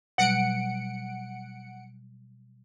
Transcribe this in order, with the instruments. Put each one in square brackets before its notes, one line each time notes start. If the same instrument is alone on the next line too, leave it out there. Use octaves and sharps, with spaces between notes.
[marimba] B2 F#3 G3 [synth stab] F#5 C#7 D7